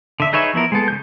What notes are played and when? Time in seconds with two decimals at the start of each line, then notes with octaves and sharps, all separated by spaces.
0.20 D3 E5
0.33 D#4 G#4 B4 C#5 E5
0.54 F3 B3 E4 A#4
0.72 G#3 B3 A4
0.88 C#3 G3 G6